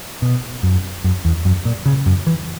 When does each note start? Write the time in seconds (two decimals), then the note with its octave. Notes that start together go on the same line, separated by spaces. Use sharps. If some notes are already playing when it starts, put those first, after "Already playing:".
0.22 B2
0.63 F#2
1.04 F#2
1.25 E2
1.45 F#2
1.65 A#2
1.86 C#3
2.06 F#2
2.27 E3